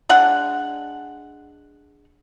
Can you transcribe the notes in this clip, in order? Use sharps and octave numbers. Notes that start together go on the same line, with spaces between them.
G#3 D4 F#5